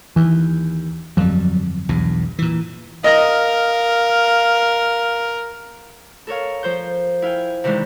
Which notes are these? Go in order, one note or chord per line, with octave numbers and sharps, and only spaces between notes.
D#2 E3
G1 F2 F#3 G3
B1 E2 G2
A#2 E3
A#4 D#5 F5 A#6
A4 A#4 C#5 F5
F3 C5 G6
E4 F5 G5 G#5
C3 D#3 E3 G#3 D4